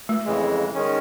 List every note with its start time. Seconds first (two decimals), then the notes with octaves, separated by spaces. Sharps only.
0.09 A3
0.25 F2 C#3 E3 G#3
0.74 D#3 G#3 C#4